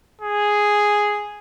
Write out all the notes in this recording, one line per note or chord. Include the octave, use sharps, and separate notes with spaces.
G#4